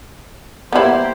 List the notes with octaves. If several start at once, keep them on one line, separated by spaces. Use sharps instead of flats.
A#3 B3 E4 G4 C5